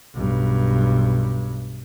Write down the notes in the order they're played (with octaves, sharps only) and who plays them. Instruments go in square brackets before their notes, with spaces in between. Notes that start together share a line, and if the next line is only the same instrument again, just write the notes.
[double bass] B1 G2